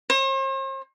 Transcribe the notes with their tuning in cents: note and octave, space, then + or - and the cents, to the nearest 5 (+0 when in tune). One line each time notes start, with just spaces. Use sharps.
C5 +45